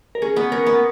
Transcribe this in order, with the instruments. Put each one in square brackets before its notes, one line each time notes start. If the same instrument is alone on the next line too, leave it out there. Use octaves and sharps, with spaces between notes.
[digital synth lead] A#4
[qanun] C#4 [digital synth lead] G#4
[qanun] B3
[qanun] C#4 [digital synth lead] A#4
[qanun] B3